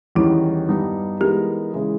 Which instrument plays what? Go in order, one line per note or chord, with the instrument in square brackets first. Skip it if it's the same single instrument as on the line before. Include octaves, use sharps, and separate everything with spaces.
[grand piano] E2 D#3 G3 C#4 [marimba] E4
[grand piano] G2 G3 B3 D#4
[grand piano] E3 G#3 B3 D#4 A#4 [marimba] G4
[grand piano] C#3 E3 G#3